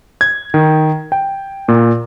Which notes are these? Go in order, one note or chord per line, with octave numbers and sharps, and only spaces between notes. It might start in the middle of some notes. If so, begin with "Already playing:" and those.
G#6
D#3
G5
A#2